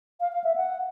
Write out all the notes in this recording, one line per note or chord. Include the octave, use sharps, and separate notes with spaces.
F5
F5
E5
F#5